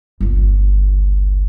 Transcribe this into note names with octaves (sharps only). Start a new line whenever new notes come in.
G1 C#2